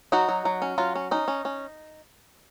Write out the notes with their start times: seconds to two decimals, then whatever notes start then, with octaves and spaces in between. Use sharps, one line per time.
0.12 F#3 D#4 F#4
0.29 F#3
0.45 F#3
0.62 C#4
0.78 F#3 F4
0.95 C#4
1.11 C#4 D#4
1.28 C#4
1.45 C#4